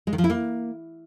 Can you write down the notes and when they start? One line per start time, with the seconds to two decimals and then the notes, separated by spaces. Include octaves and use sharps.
0.07 G#3
0.13 D#3
0.18 F3
0.24 E4
0.30 A#3